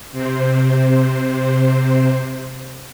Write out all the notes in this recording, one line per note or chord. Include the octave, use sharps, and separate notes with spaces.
C3 C4